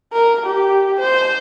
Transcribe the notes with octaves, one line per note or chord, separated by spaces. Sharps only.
A#4
G4
C5